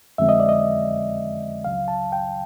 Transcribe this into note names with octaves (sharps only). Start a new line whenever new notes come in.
F2 D3 F3 G#3 C4 E5
D#5
D5
D#5
C#2 C#3 F#3 F5
A5
G5